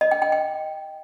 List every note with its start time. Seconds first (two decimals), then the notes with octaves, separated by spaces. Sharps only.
0.01 D#5
0.11 G5
0.22 G5
0.32 G5